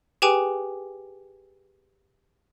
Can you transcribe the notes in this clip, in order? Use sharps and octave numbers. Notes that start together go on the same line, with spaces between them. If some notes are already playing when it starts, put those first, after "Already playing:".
G4 G#4 B4 G5 G#5 D6